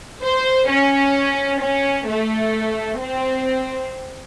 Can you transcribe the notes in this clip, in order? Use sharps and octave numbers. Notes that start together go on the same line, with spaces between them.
C5
C#4
C#4
A3
C4